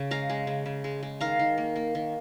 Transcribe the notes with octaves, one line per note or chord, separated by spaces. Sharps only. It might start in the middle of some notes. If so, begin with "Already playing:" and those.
Already playing: C#3
G#3 F5 A#5
G#3
C#3
C#3
G#3
G#3
D#3 F5 A#5
D#3
A#3
A#3
D#3